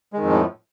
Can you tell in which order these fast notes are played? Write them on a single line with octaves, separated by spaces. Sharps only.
G#3 D#3 F2 F3 A2